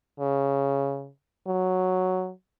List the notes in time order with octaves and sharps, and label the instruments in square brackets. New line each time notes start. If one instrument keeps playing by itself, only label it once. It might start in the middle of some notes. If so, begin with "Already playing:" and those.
[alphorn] C#3
F#3